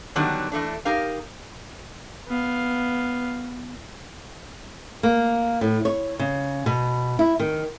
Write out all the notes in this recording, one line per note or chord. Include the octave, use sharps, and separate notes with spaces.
D3 D#3 F#3 G3 B3 D4
E3 A3 D4
D#4 G4 A#4 F5
B3 F5
A#3
A2
C#5
C#3
B2
E4
D#3